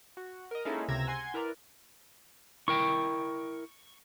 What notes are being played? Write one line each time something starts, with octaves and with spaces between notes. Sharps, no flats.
F#4
A#4 D#5
G#3 A#3 C#4 D#4 E4 A4
C#2 C3 A#5 E6 G#6 A#6
F#5 G#5 C6 G#6
E4 A#4 B4 D5 A#5
E4 A#4 G5 C#6